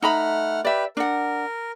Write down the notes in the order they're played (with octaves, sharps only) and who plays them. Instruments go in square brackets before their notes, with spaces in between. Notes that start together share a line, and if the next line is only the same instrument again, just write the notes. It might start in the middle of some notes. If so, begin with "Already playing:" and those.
[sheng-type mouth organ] A3 F#5 F6 [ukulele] D#4 A#5 B5
[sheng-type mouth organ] G4 B4 [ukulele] D5 E5
[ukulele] D4 F#5 [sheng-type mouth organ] A#4